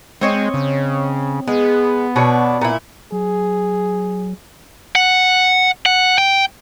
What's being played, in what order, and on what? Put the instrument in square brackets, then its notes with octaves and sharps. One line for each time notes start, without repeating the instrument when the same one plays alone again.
[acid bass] G#3 [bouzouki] C4 C#5 D#5
[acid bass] C#3
[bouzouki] G#3 [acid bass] B3
[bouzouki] B2 D4 C#5
A#2 E4
[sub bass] F#3 [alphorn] G#4
[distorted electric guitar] F#5
F#5
G5